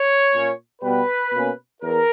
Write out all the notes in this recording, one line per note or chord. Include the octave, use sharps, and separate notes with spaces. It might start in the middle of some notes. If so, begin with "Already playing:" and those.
Already playing: C#5
A#2 A#3 C#4
B2 G3 B3 B4
B2 A#3 C#4
E2 A#4